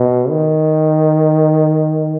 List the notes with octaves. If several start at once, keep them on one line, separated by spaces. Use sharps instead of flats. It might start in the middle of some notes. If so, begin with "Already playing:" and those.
Already playing: B2
D#3